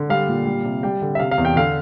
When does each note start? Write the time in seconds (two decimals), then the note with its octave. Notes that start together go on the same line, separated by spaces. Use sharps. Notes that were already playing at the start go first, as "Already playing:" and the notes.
Already playing: D3
0.09 G3 F5
0.28 A#2
0.46 G3
0.65 C3
0.83 G3 G5
1.02 D3
1.15 E5
1.20 C3 F5
1.31 F5
1.38 E2
1.45 G5
1.56 D3 F5